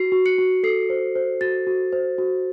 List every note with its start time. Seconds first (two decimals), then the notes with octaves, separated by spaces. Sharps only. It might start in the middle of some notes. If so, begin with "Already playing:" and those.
Already playing: F#4 C7
0.12 F#4
0.26 C#7
0.38 F#4
0.63 A4 C7
0.90 C5
1.15 C5
1.41 F#4 A6
1.67 F#4
1.92 C5
2.18 F#4